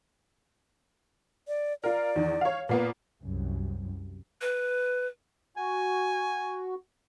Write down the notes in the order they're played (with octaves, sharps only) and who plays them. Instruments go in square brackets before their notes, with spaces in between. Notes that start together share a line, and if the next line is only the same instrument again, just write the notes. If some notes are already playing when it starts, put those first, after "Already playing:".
[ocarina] D5
[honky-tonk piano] F4 A#4 [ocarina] D5
[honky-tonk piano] E2 D#3
C#5 F5
[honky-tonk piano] A#2 A#3 B3 [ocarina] B4
[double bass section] C2 F#2
[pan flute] B4
[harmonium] F#4 [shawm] G#5